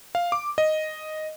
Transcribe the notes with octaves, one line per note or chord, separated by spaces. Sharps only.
F5
D6
D#5